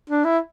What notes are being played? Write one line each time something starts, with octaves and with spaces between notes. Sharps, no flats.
D4
E4